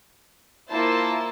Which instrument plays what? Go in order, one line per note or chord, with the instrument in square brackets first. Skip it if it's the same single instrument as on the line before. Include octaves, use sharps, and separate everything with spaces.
[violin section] A#3 E4 F4 C5 A5